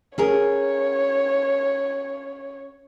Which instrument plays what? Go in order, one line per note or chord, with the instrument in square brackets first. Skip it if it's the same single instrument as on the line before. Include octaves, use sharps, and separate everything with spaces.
[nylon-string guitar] C#4 G#4 A#4 [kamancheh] C#5